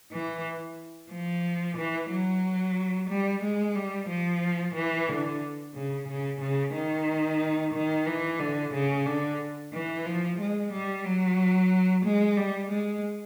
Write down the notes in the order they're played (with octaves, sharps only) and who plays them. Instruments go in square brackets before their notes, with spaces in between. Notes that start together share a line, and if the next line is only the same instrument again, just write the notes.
[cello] E3
F3
E3
F#3
G3
G#3
G3
F3
E3
D3
C#3
C#3
C#3
D#3
D#3
E3
D3
C#3
D3
E3
F3
G#3
G3
F#3
G#3
G3
G#3